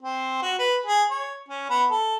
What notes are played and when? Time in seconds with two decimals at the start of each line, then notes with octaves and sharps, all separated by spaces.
0.02 C4
0.42 F#4
0.59 B4
0.86 G#4
1.11 C#5
1.48 C#4
1.70 B3
1.91 A4